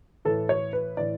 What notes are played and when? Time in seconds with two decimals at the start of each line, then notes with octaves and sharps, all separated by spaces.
0.25 A2 E3 A4
0.49 C#5
0.73 B4
0.97 A2 E3 D5